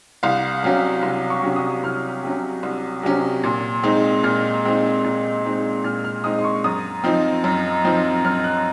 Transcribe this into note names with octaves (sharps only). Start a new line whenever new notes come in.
C2 F5
C3 F#3 C#4 F5
C2
C#6
C3 F#3 C#4
D#6
C2 F6
C3 F#3 C#4
C2
C3 F#3 C#4
A#2
G#3 C4 D#4
A#2 F6
G#3 C4 D#4
A#2
G#3 C4 D#4
A#2 F6
F6
G#3 C4 D#4 D#6
C6
C#6
F#2 D#6
F3 C4 D#4
F#2
F3 C4 D#4
F#2 F6
F#6